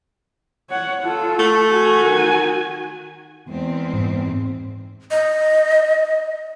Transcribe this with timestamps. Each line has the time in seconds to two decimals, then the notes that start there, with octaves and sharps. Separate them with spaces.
0.70 C#5 F#5
1.02 F4 A4
1.39 A3
1.70 F#4 G#5
2.04 D#3
3.49 E2 G#3 C4
3.93 G#2
5.11 D#5